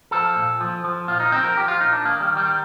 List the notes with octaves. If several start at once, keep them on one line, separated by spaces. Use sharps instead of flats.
F3 A4
A#2
F3
F3
A#2 F4
D#4
F3 C4
A#4
F3 G4
F4
A#2 D#4
D4
D#3 A#3
G3
D#3
G3